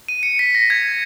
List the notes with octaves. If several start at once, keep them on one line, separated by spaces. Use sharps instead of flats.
D#7
C#7
B6
A#6
G#6